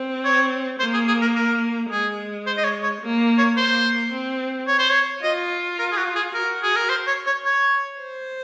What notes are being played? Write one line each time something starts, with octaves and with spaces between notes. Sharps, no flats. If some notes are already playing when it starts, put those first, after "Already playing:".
Already playing: C4
C#5
A#3 C5
G#4
G#4
A#4
A#4
G#3 G#4
C5
D#5
C#5
C#5
A#3
C#5
A#3 C5
C4
C#5
C5
C#5
F4 D#5
A#4
G#4
F#4
G#4
F#4 A#4
G#4
A#4
C5
C#5
C#5
C#5
C5